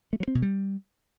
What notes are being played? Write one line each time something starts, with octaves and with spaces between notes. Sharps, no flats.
A3
F#3
C4
B2
G3